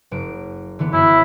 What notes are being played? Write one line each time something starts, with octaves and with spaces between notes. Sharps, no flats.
F#1 D7
D3 E3 B3
F#2 E4